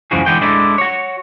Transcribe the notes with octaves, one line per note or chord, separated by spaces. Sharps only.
C#2 F#2 E3 F3 F#4 G#4
D3 E3 G#3 B3 G#4 G5
G#3 D4 E4 A4
F#4 C#5